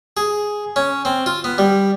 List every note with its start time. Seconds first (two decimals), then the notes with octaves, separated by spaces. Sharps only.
0.17 G#4
0.76 C#4
1.05 C4
1.26 F4
1.44 B3
1.58 G3